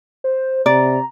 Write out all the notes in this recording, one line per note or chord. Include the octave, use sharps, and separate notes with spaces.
C5
C3 D5 A#5